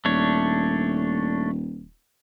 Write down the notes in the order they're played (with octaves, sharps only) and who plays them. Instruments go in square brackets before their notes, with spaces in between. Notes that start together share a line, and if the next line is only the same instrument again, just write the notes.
[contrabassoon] D#1 [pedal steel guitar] A3 D4 C#5